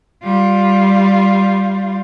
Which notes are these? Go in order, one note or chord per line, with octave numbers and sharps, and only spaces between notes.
G3 F4